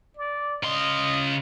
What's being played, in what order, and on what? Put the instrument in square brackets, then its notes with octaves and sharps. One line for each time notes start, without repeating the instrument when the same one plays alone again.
[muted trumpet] D5
[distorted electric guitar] C#3 C6 [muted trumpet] D#5